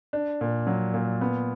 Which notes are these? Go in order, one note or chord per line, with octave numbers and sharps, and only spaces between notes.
D4
A#2
F#3
A#2
B3